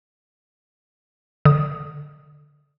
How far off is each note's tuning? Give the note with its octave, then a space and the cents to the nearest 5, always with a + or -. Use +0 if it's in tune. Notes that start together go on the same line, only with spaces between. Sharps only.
D3 -5 D#6 +0